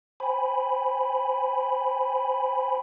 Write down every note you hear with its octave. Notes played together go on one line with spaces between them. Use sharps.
C5 G5 G#5 B5